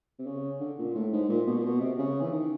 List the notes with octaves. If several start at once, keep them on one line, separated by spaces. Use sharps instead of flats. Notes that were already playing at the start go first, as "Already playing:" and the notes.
C3
C#3
D3
A#2
A2
G#2
A#2
B2
A#2
B2
C3
C#3
E3
D#3